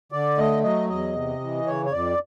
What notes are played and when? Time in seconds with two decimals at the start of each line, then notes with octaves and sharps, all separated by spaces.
0.12 D3 D5
0.38 A3 D#5
0.63 F#3 D#5
0.89 E2 D#5
1.15 C3
1.41 E3
1.67 C#3 C#5
1.86 C#5
1.92 F2 D5